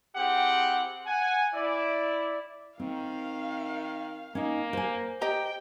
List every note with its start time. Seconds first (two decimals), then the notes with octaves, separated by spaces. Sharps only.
0.16 C4 E4 G4 G#4 F#5 G5
1.07 F#5 G#5
1.54 E4 D5
2.80 D#3 C4 F5
4.35 A#3 C#4 D#4
4.73 C5 G#5
5.21 G4 D#5 G5 A#5